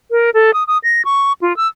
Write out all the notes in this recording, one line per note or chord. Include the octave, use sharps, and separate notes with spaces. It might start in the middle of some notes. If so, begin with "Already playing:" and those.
A#4
A4
D#6
D#6
A#6
C#6
F4
E6